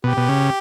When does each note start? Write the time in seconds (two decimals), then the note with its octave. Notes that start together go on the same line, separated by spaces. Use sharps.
0.04 B2 G4
0.17 B2
0.29 C#3